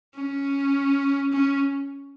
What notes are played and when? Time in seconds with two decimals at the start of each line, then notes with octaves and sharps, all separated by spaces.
0.15 C#4
1.32 C#4